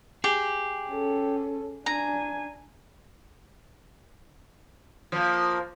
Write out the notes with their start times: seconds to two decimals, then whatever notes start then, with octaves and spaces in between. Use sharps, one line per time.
0.24 G4 G#4
0.89 C#4 A4
1.86 D4 G#5 A#5
5.12 F3 A#3